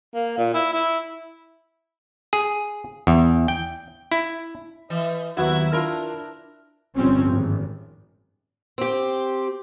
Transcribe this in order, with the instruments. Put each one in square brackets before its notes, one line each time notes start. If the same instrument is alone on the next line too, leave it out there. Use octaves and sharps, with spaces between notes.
[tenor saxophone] A#3
A#2
E4
E4
[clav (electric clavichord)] G#4
E2
G5
E4
[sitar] E3 [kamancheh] D#5
[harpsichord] D#2 F#3 B3 [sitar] E4 [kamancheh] F#4
[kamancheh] D4 [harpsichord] E4 F4 F5 [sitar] A#4
[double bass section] G1 A2 F3 G3 C4 C#4
G#1
[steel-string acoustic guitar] C4 G4